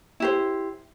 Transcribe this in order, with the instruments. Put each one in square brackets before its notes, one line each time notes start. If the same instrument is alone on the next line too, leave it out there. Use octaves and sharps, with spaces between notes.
[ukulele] E4 G4 C5